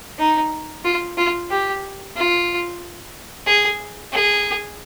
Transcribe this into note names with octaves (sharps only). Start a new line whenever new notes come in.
D#4
F4
F4
G4
F4
G#4
G#4